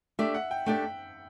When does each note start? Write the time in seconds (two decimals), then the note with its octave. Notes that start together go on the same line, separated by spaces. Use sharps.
0.19 A3 D4 G4 D5 E5
0.34 F#5
0.51 G5
0.66 A3 D4 G4 D5 G5